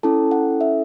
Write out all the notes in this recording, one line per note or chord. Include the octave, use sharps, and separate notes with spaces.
C#4 E4 A4 A5
F#5
E5